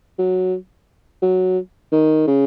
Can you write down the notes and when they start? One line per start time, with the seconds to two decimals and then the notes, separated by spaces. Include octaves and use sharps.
0.19 F#3
1.22 F#3
1.92 D#3
2.28 C#3